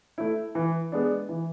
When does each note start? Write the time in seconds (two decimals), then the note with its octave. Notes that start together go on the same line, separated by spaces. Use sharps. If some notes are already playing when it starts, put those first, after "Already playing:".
0.18 A3 E4
0.55 E3
0.92 G#3 B3 D4
1.29 E3